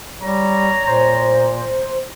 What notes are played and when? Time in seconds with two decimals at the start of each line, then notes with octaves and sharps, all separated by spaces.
0.21 G3 C#5 A#5
0.87 A#2 C5